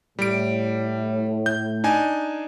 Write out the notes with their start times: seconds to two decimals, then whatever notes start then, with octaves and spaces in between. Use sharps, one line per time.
0.19 A2 G3 D7
1.46 G6
1.84 D4 D#4 G#5